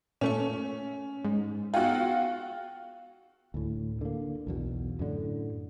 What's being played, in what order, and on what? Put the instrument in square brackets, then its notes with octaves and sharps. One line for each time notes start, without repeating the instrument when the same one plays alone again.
[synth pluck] A#2 A3 C#6 [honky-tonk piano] C#4
[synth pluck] G#2
[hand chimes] B3 G5 [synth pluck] D#4 G#4 [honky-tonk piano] F4 F#4
[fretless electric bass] D2 A2
D3 A#3
B1 E2 B2
F#2 A2 D3